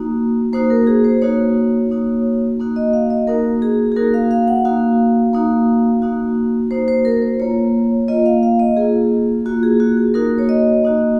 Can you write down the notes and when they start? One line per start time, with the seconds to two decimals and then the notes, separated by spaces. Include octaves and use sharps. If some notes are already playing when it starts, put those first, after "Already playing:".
Already playing: A#3 D#4 F#4
0.53 A#3 D#4 F#4 C5
0.70 A#4
0.87 G#4
1.05 C5
1.22 A#3 D#4 F#4 C#5
1.91 A#3 D#4 F#4
2.59 A#3 D#4 F#4
2.76 D#5
2.93 F5
3.10 D#5
3.27 A#3 D#4 F#4 A#4
3.62 G#4
3.92 G#4
3.96 A#3 D#4 F#4 A#4
4.14 F5
4.31 F5
4.48 F#5
4.65 A#3 D#4 F#4 F5
5.33 A#3 D#4 F#4
6.02 A#3 D#4 F#4
6.71 A#3 D#4 F#4 C5
6.88 C5
7.05 A#4
7.22 C5
7.40 A#3 F4 C#5
8.08 A#3 F4 D#5
8.26 F5
8.43 F5
8.59 D#5
8.77 A#3 F4 G#4
9.46 A#3 F4 F#4
9.63 G#4
9.80 F#4
9.97 G#4
10.14 A#3 D#4 F#4 A#4
10.38 C#5
10.49 D#5
10.83 A#3 D#4 F#4